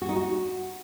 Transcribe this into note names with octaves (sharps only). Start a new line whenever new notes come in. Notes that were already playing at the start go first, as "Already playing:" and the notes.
F#4
D#4
F#4